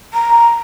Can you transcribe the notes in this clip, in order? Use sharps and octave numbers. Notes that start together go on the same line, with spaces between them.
A#5